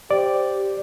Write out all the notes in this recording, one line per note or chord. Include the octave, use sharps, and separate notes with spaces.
G4 C5 D5